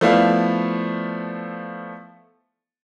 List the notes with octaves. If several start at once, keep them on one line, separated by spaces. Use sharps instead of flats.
F3 A3 B3 E4 D5 F5